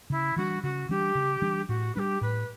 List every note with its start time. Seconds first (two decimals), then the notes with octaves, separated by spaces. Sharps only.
0.10 C#3 E4
0.36 E3 G3 D4 F#4
0.63 C#3 F#4
0.89 E3 G3 D4 G4
1.15 C#3
1.42 E3 G3 D4
1.68 A2 F#4
1.94 G3 D4 G4 B4
2.21 A2 B4